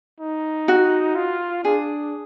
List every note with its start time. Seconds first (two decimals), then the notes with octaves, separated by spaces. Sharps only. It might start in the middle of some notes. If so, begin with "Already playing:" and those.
0.20 D#4
0.68 F#4
1.16 F4
1.64 D4 G#4